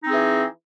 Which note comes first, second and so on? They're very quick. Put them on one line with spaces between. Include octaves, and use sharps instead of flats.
D#4 C4 G#4 E3